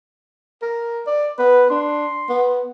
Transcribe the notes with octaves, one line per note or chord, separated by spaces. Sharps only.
A#4
D5
B3 B4
D4 C6
B3